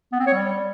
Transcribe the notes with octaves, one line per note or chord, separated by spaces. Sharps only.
B3
C4
C#5
G3